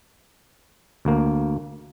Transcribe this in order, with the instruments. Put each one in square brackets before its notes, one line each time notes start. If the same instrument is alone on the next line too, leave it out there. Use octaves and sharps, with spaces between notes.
[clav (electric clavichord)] D2 A#3